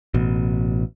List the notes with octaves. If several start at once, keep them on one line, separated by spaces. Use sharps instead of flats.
A1 B2